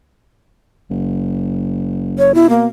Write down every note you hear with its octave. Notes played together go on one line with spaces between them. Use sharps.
F#1
C#5
B2 E4
A#3